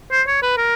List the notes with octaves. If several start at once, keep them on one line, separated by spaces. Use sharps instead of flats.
C5
C#5
B4
A#4